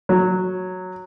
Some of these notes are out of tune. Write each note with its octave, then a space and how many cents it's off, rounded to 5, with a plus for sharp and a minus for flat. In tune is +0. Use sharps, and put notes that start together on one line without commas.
F#3 -5